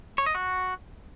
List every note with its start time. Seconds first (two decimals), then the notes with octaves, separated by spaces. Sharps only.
0.18 C#5
0.26 D#5
0.35 F#4